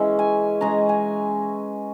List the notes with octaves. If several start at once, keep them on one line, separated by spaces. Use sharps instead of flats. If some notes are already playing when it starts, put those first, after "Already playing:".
Already playing: E3 G#3 C#4 E5
G#5
E3 G#3 C#4 A#5
G#5